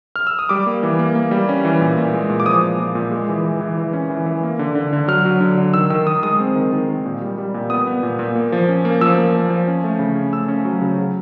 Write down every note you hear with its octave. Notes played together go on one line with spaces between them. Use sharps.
F6
E6
D#6
G3 D6
A#3
E3
A#3
A#3
G3
C#4
E3
A#2
A#2
G#3
A#2
D6
F3 D#6
A#2
A#2
A#2
G#3
E3
E3
E3
E3
C#4
E3
E3
A#3
D3
D3
D3
F#3 F6
F#3
D3
D3
D#3 E6
D#3 E6
D#3 D#6
G#3 D#6
C4
D#3
D#3
D#3
A#2
G3
G3
A#2
B3 D#6
B3
A#2
A#2
A#3
F3
C#4
A#3
F3 E6
A#3
F3
F3
C#4
A3
C#3
C#4
A3 E6
C#4
F#3
C#3
F#3